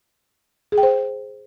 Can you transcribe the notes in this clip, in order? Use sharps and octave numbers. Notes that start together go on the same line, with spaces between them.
G#4
G5
C5